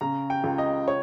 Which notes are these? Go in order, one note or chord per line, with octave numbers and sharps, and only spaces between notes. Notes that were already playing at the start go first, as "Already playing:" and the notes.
C#3 A#5
G5
C#2
D#5
C#5